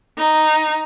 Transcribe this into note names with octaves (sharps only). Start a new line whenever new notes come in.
D#4